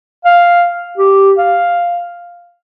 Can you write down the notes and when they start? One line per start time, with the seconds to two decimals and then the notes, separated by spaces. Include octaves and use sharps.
0.25 F5
0.97 G4
1.38 F5